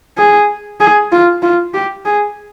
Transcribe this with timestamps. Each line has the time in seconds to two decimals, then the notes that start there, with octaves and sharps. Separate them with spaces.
0.18 G#4
0.80 G#4
1.12 F4
1.42 F4
1.74 G4
2.05 G#4